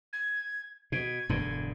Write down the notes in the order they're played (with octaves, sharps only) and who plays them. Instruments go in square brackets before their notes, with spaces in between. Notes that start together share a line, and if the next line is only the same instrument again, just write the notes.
[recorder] G#6
[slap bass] B2 [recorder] G#6
[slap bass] E1 G2 D3